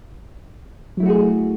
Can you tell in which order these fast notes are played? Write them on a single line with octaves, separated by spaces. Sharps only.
F#3 E4 A3 F#4 G#4